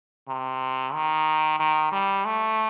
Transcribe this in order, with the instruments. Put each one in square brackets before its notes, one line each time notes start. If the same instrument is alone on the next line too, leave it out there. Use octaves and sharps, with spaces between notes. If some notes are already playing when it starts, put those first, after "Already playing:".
[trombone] C3
D#3
D#3
G3
A3